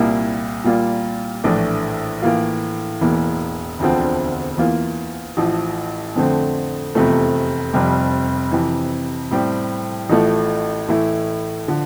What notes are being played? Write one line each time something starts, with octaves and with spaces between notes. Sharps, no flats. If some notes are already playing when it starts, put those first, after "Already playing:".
Already playing: C2 A#2 G3 A#3 E4
A#2 G3 A#3 F4
A#1 A2 E3 A3 D4
A2 E3 A#3 F4
E1 E2 E3 A#3
E1 D2 D3 F3 C4
E2 E3 A#3 F4
A1 A2 F3
F2 D3 A3 C4
F1 E2 C3 F3 A3
F1 F2 C3 G3
F2 C3 E3
A2 G3 C4 G4
A1 A2 F3 A3
A2 E3 A3 E4
D3 F3